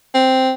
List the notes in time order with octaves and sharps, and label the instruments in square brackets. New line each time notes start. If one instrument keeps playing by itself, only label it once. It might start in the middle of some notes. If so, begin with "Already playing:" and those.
[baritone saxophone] C4